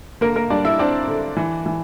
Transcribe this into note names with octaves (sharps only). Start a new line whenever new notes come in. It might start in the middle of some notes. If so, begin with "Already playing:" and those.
D3 A#3 A#4
A#3 A#4
G3 D4 D5
E4 E5
C4 D4 D5
D3
E3
E3